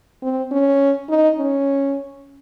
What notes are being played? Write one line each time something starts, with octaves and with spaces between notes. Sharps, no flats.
C4
C#4
D#4
C#4